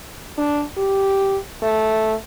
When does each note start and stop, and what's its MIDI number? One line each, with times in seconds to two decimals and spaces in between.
0.38 0.63 62
0.77 1.38 67
1.63 2.14 57